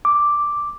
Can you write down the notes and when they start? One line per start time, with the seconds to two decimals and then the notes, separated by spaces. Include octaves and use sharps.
0.05 D6